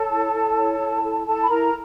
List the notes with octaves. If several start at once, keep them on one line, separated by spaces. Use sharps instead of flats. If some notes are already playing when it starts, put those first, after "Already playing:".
Already playing: A4 C#5 A5
E4
E4
C#5
E4
A4
E4 A4 A5
B5
E4 A#4 A#5